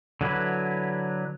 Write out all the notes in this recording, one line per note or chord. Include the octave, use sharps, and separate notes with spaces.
D3 F#3 E4 B4